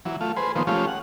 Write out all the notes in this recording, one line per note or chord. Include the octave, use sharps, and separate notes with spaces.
E3 F#3
A3 F4
G#4 B4 C5
D#3 F3 A#3 B3 C5
F3 G#3 A3 C#4 F4 G4
F#5